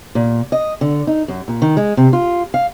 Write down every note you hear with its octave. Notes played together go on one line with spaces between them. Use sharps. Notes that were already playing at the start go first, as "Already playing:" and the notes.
A#2
D#5
D3
D#4
F#2
A#2
D#3
G#3
C3
F4
F5